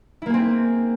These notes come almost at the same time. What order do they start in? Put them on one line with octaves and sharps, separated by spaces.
E4 A#3 G#4 C4